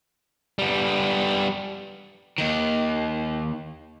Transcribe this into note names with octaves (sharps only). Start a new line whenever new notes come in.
G3 B3
D#2 D#3